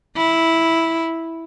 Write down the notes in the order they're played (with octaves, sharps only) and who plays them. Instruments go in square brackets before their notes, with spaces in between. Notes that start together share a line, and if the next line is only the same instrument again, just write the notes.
[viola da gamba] E4